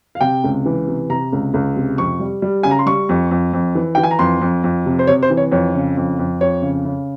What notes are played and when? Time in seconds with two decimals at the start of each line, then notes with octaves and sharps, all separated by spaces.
0.15 F5
0.21 C3 G5
0.44 C#2
0.65 E3
0.88 C3
1.10 C3 A#5
1.32 C#2
1.54 C#2
1.76 C3
1.98 F2 C#6
2.20 G3
2.42 G3
2.63 C#3 G#5
2.71 A#5
2.79 C6
2.86 G3 C#6
3.09 F2
3.31 F2
3.53 F2
3.75 E3
3.95 E3 G5
4.03 G#5
4.11 A#5
4.19 F2 C6
4.41 F2
4.64 F2
4.86 C3
4.99 C5
5.07 C3 C#5
5.23 C5
5.30 E3
5.37 C#5
5.52 F2 C#5
5.74 C#3
5.97 F2
6.19 F2
6.41 F2 C#5
6.62 C#3
6.85 C#3